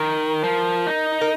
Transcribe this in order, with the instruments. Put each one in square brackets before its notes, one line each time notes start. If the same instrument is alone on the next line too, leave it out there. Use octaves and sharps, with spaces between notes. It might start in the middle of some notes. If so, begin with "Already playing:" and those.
Already playing: [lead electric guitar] D#3 [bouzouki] A#4
[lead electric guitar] F3
D#4
[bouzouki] A#4